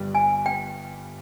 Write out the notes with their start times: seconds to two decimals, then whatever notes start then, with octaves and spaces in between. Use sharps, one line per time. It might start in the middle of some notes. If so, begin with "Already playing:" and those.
Already playing: G1 G2 G3
0.15 G#5
0.46 G5